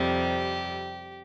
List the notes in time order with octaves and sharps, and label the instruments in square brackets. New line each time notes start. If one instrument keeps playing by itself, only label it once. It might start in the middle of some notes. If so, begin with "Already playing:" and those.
Already playing: [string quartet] F2 C3 G3 G4